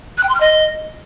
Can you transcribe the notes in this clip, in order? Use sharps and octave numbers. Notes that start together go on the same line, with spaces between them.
F#6
G5
C6
F6
D#5